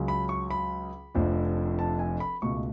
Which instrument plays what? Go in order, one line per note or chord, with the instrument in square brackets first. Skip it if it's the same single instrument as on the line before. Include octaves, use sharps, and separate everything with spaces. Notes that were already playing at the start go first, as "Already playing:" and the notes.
Already playing: [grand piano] C#2 C#3 F#3
B5
C#6
B5
F1 F2 F3 A3 D4
A5
G#5
B5
C#2 B2 A3 C#6